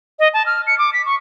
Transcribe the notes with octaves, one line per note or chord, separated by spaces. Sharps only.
D#5
A5
F6
C#7
D6
B6
C#6